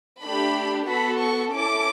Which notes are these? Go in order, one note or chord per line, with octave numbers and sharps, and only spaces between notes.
A3 D4 G4 B5
B3 F#4 A4 B5
C#6
C#4 E4 A4 D6